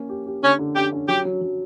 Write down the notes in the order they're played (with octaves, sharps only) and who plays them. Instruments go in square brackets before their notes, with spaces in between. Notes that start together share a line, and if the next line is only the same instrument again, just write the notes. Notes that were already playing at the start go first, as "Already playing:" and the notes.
Already playing: [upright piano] A#3 C#4
G4
G4
[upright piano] D3 [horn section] C#4
[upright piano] D3
[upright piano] C#4 [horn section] G4
[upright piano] C#4
[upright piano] F#3 [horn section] G4
[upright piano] F#3
F#3